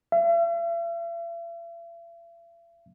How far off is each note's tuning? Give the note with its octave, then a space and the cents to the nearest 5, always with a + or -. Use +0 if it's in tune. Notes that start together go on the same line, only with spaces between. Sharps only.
E5 +45